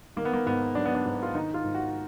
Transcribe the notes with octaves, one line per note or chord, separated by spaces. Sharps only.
D#3 A#3
B3
A#3
G#2 B3
F#3 D4
B3
D4
G#2
F4
D#3 D#4
F4
G#2
F#4